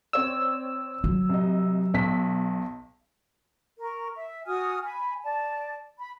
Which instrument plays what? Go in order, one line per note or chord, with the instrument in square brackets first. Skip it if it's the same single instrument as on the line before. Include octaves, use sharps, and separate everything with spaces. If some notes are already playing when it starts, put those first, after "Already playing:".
[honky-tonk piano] C4 C#5 D5 [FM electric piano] E6
[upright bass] F#3
[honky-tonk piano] C2 D#5
B1 B6
[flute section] A#4 C#6
E5
F#4 G#5 D#6 F6
G#5 B5
D5 A5
B5